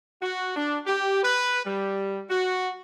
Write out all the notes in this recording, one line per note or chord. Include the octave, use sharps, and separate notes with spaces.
F#4
D4
G4
B4
G3
F#4